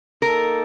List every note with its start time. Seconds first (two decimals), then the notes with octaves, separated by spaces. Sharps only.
0.22 A#3 D#4 A4 A#4